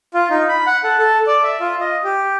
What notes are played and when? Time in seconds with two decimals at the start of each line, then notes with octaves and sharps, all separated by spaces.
0.14 F4
0.30 D#4
0.48 B5
0.66 F#5
0.84 A4
0.98 A4
1.27 D5
1.43 E5
1.60 F4
1.81 D#5
2.04 G4